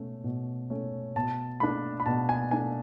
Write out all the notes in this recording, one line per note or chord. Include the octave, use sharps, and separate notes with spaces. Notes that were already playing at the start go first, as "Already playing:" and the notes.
Already playing: B2 A3 C#4
B2
A3 C#4
B2 A5
A3 D4 B5
B5
B2 A5
G#5
A3 D4 G#5